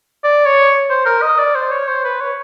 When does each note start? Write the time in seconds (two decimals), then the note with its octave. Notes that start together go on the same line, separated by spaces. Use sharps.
0.24 D5
0.46 C#5
0.90 C5
1.06 A#4
1.22 D#5
1.38 D5
1.55 C5
1.71 C#5
1.88 C5
2.04 B4
2.21 C#5